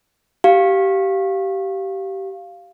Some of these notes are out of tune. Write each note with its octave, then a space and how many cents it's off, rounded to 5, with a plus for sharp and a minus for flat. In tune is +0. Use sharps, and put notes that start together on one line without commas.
G4 -20 F5 +0